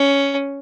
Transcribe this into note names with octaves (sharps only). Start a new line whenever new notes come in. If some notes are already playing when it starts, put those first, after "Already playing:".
Already playing: C#4